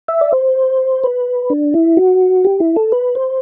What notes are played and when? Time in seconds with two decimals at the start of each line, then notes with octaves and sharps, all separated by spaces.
0.08 E5
0.21 D5
0.33 C5
1.04 B4
1.50 D4
1.74 E4
1.97 F#4
2.45 G4
2.60 E4
2.76 A4
2.92 B4
3.15 C5